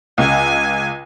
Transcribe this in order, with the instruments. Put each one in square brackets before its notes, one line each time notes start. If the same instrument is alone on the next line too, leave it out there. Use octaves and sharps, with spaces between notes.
[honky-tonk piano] C#2 [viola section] G#5